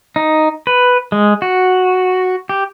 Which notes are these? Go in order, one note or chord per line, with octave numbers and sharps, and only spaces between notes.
D#4
B4
G#3
F#4
G4